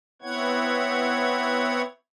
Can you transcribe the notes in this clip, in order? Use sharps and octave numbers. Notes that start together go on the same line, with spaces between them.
B3 C4 E4 C#5 F#5 G#6